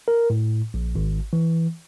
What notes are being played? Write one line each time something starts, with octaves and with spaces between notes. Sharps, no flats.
A#4
A2
A#1
G#1
E3